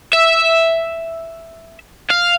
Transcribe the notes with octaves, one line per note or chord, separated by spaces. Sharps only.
E5
F5